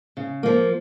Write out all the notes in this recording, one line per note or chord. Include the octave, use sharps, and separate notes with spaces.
C#3
F3 A#3